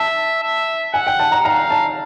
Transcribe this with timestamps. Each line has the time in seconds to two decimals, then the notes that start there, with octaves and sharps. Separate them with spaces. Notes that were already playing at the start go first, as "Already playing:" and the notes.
Already playing: E5 A5
0.43 E5
0.94 F#5 G#5
1.07 G5
1.19 A5
1.32 A#5
1.45 F5 A#5
1.70 A5